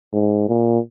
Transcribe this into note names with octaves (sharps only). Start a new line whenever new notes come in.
G#2
A#2